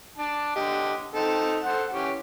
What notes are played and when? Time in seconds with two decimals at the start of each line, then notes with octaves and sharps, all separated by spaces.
0.18 D4 A5
0.56 D3 G4 D#5
1.14 C4 D#4 A4
1.64 A4 C5 F#5
1.93 E3 C#4 G4